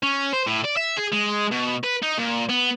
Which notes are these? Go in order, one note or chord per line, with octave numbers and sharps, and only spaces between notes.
C#4
C5
A2
D5
E5
G#4
G#3
B2
B4
D#4
A#2
B3